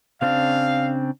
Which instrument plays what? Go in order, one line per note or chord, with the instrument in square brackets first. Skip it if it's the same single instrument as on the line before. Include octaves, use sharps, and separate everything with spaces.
[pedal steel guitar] C#3 C4 D4 [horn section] F5